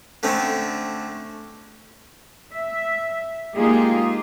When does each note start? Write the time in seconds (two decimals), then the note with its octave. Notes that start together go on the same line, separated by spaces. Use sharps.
0.23 D3 A3 C4 C#4
2.53 E5
3.55 G#3 A#3 D#4 F4 G4 G#4